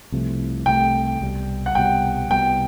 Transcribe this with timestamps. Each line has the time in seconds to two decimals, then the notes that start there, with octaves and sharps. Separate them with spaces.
0.12 C2 C3 F3 A3
0.66 C2 C3 F3 A3 G5
1.21 C2 B2 G3
1.66 F#5
1.75 C2 B2 G3 G5
2.30 C2 B2 G3 G5